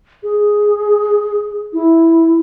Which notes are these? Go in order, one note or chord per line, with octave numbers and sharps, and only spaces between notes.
G#4
E4